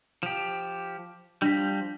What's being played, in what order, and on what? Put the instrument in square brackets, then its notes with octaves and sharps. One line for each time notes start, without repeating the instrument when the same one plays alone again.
[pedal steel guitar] F3 G4
[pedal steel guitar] F3 G3 [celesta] D4 A#6 B6